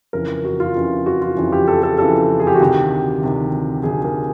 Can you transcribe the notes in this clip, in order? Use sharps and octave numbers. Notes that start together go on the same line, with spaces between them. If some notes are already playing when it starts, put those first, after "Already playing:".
F2 C#3 E3 A#4
F#4
F4
F2 C#3 E3
F#4
F4
F2 C#3 E3
G4
A4
A4
F2 C#3 E3 A4
G#4
G4
F#4
D2 C3 D#3 G4
D2 C3 D#3
D2 C3 D#3 G#4
A#4